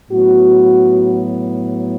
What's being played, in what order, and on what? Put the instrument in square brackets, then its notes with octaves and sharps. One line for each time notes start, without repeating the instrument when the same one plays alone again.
[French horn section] A2 F#3 B3 F#4